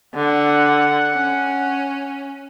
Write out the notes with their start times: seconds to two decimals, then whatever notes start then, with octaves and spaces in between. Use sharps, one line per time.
0.14 D3 F#5
1.13 C#4